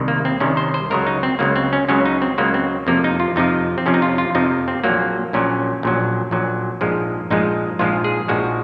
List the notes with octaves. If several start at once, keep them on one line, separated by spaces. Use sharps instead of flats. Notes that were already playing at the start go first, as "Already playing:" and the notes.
Already playing: C2 C3 D#3
A#3
C4
C2 C3 D#3 C#4
C5
C5
C#2 C#3 F#3 A#4
D#4
C4
C#2 C#3 F#3 A#3
C4
C#4
C#2 C#3 F#3 C#4
D#4
C4
C#2 C#3 F#3 A#3
C4
F2 C3 F3 A#3
D#4
F4
F2 C3 F3 D#4
C4
F2 C3 F3 C#4
D#4
F4
F4
F2 C3 F3 D#4
C4
A#1 A#2 F#3 A#3
A#1 A#2 F#3 C#4
A#1 A#2 F#3
A#1 A#2 F#3
A#1 G#2 F3 G#3
A#1 G#2 F3 G#3 D#4
A#1 G#2 F3 G#3 F4
G#4
A#1 G#2 F3 G#3 F#4